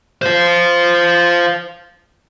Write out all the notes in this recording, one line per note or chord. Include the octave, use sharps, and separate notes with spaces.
C5 F5